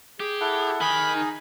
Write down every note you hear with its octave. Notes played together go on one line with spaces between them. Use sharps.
G4 G#4
E4 A4 F#5
D#3 G#4 B5
D#4